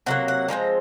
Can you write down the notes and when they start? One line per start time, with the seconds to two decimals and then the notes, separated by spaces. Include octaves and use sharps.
0.06 C3 F#3 A#3 F#5
0.28 F#5
0.48 A#2 F3 G#3 C4 A#5